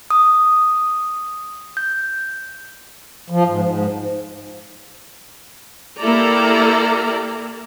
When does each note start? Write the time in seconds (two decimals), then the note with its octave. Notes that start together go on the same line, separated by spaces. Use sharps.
0.11 D#6
1.77 G6
3.30 F3
3.47 G#2
3.62 G#2
5.99 A#3 E4 G4 A4 D5 A#5